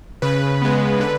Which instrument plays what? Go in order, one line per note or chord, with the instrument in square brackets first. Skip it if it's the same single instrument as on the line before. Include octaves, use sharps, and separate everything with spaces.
[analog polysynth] C#3 B4
G#3 B3
D3 B4